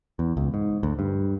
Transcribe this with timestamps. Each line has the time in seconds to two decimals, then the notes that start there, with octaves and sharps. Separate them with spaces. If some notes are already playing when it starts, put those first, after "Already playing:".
0.19 E2
0.37 C#2
0.54 G#2
0.83 D2
0.99 G2